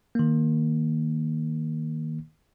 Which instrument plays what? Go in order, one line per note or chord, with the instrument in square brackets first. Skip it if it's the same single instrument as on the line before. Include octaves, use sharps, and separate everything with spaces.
[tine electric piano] D#3 A#3